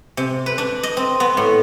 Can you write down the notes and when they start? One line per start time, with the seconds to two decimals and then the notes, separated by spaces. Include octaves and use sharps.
0.17 C3
0.46 B4
0.58 D4
0.83 D#5
0.97 C4
1.20 B3
1.37 A2